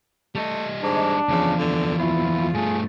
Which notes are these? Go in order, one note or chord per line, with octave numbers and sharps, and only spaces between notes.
G3 A3 D#5
G#2 D4
E2 C#3 F3
D3
E4 F4
G2 A3 G#4